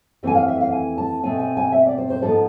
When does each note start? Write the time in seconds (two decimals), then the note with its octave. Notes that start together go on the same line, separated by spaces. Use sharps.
0.23 F2 E3 A3 C4 G#5
0.35 F5
0.48 E5
0.61 F5
0.72 G#5
0.98 A5
1.23 B2 A3 C4 G#5
1.39 G#5
1.57 G#5
1.72 E5
1.86 D5
1.98 C5
2.10 C5
2.23 G#2 F3 B3 A4